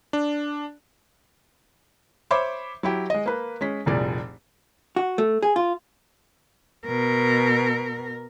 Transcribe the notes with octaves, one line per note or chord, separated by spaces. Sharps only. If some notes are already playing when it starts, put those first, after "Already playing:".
D4
C5 C#5 E5 B5 D6
F#3 E4 G4
G#3 D#5
A#3 B4
G#3 C#4 B6
F1 C2 A#2 G#4 D5
F#4
A3
G#4
F4
B2 A#4